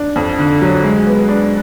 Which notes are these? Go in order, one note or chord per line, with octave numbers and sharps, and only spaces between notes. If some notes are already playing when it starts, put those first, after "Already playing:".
Already playing: D4
F2
D3
F#3
G#3
B3
D4